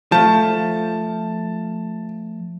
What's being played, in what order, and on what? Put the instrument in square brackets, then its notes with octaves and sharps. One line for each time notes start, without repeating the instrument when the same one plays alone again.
[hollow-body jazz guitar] F3 A3 [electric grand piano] A5